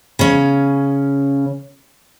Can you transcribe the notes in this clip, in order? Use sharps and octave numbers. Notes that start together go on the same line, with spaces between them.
C#3 C#4